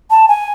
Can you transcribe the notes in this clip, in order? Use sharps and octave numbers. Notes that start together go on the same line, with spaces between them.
A5
G#5